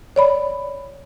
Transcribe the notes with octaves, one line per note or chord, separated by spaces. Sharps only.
C#5 D5 B5